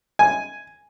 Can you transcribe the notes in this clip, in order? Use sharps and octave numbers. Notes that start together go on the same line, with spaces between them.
G#5